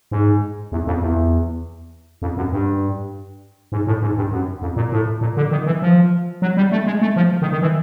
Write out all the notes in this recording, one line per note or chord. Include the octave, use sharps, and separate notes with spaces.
G#2
E2
F2
E2
F2
F#2
G2
G#2
A2
G#2
G2
F#2
F2
A#2
A2
A#2
D3
D#3
E3
F3
F#3
G3
A3
G#3
A3
F3
D#3
D#3
E3